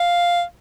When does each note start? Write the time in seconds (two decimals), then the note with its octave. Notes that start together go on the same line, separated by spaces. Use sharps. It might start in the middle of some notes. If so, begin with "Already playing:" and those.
Already playing: F5